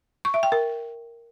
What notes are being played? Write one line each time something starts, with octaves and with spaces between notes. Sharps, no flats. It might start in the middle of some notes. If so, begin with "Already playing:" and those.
C#6
E5
G5
A#4